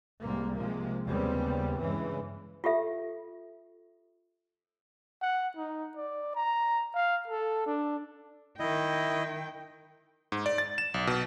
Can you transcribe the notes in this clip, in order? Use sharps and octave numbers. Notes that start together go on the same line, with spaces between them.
C2 G#2 G3 A#3
C3 F3 G#3 A#3
D#2 C#3 G3 B3 C4
G2 C#3 E3 G#3
F4 G4 A4 E5
F#5
D#4
D5
A#5
F5
A4
D4
D#3 E4 D#5 G5
G#2
D5
A6
E7
B1
B2